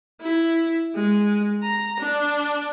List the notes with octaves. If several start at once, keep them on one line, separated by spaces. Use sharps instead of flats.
E4
G#3
A#5
D4